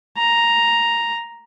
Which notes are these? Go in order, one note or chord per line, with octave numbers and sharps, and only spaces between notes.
A#5